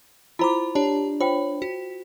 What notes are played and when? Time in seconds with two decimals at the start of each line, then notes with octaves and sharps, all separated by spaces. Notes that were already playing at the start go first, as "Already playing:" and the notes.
0.39 E4 F4 C5 A#5 D6
0.75 D4 G4 C#5 A5
1.20 F4 C5 C#5 G5
1.62 F#4